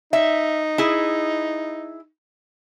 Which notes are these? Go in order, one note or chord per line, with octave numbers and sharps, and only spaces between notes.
D#4 E5
E4 G#4